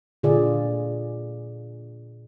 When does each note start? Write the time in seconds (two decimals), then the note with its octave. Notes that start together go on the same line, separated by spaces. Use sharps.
0.23 A#2 D3 F4 G#4 D5 F5